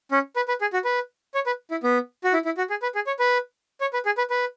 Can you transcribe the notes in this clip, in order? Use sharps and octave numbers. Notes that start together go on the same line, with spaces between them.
C#4
B4
B4
G#4
F#4
B4
C#5
B4
E4
B3
F#4
E4
E4
F#4
G#4
B4
G#4
C#5
B4
C#5
B4
G#4
B4
B4